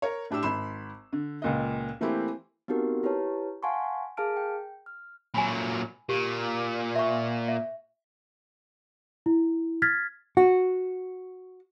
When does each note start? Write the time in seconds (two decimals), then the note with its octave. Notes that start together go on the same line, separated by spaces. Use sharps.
0.02 A#4 C#5
0.31 A2 D4 G4 E6 E7
0.43 G#1 B5 C6 E7
1.13 D3
1.42 C#2 A#2 D#5
2.01 E3 A3 A#3 C4 E4 G4
2.68 B3 C4 D#4 F#4 G4 A#4
3.03 E4 G4 B4 C#5 A5
3.63 F5 F#5 G#5 A5 C6 C#6
4.17 G#4 A#4 F5 A5 F6 D7
4.37 G5
4.86 F6
5.34 A#2 F#3 G#5 B5
6.09 A#2 G4
6.96 E5 C#6
7.48 E5
9.26 E4
9.82 F6 G#6 A6 B6
10.37 F#4